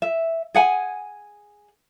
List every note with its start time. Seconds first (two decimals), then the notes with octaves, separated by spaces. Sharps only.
0.02 E5
0.54 G#4 F#5 G#5